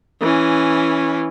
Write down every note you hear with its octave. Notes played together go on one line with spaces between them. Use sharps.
E3 C#4